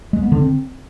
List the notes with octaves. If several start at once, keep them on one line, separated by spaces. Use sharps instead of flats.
G#3
B3
D3
C4